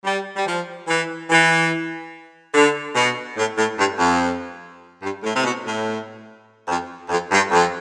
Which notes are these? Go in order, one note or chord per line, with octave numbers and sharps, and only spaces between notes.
G3
G3
F3
E3
E3
D3
B2
A2
A2
G2
F2
G2
A2
C3
B2
A2
F2
F2
G2
F2